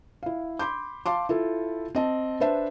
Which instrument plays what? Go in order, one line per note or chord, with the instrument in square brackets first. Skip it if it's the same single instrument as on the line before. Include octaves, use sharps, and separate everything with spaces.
[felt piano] E4 F5
B5 C6 D6 G6
F5 A5 C6 D6
E4 F4 A4
C4 D#5 A5
D4 B4 C5 E5 A5